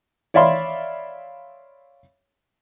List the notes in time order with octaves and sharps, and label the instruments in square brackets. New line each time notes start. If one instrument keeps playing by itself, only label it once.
[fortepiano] C#5 D5 E5 F5 B5 C6